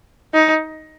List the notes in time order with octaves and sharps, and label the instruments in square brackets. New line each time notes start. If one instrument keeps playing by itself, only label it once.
[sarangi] D#4